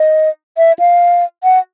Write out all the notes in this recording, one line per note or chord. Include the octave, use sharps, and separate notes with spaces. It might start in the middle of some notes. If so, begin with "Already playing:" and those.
Already playing: D#5
E5
F5
F#5